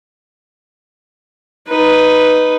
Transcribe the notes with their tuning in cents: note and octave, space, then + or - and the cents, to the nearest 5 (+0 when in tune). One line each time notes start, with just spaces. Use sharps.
D#4 +0 B4 +0